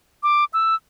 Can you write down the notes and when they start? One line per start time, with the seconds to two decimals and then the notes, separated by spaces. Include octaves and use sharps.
0.23 D6
0.53 E6